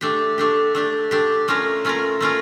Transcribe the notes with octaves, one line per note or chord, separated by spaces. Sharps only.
A3 D4 G4
A3 D4 G4
A3 D4 G4
A3 D4 G4
A3 C#4 F4 A#4
A3 C#4 F4 A#4
A3 C#4 F4 A#4